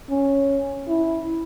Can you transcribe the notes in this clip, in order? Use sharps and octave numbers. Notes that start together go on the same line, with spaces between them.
C#4
E4